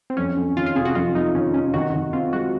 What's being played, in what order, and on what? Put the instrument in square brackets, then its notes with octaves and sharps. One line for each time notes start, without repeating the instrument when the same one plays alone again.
[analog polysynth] C4
[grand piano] F2 [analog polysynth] C#4
[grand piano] F2
[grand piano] D#3 [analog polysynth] F4
[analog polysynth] F4
[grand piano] C3 [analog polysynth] G#4
[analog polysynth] F#4
[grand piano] F2 [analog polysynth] F4
[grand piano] F2 [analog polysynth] D#4
[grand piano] D#3 [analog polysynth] C#4
[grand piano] C3 [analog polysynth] C#4
[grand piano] D#3 [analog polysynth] F#4
[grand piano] D#3
[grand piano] C4 [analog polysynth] F4
[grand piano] G#3 [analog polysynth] F#4